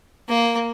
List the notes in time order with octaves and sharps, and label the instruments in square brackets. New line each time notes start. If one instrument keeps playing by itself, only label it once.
[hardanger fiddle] A#3